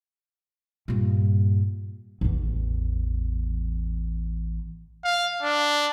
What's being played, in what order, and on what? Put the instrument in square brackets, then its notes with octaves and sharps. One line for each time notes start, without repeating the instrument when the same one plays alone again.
[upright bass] G2 A#2
A1 E2
[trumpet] F5
D4